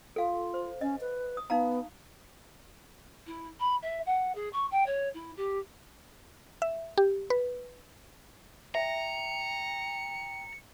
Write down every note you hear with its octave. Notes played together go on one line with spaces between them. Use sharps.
F4 A4 F5
C5
C#4 D#5
B4
D#6
B3 D#4 F5 A#5
E4
B5
E5
F#5
G#4
C#6
G5
C#5
E4
G4
E5
G4
B4
E5 G5 A#5 C#7